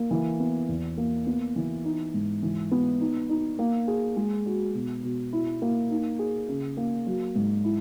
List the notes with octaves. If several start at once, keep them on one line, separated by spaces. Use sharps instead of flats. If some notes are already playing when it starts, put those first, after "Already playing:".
Already playing: A#3
E3
B3
E2
A#3
B3
E3
D#4
G#2
E3
B3
D#4
D#4
A#3
G#4
G#3
F#4
B2
B2
E4
A#3
D#4
G#4
C#3
A#3
F#3
G#2
E4